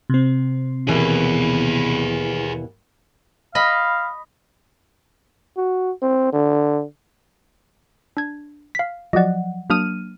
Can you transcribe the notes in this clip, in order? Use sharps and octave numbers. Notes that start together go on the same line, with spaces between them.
C3 C4
D#2 B2 E3 G#4 B4
D#5 F5 B5
F#4
C4
D3
D4 G#6
F5 B6
F3 F#3 D5 D#5 F#5
F#3 A#3 D4 D#6 F6 D#7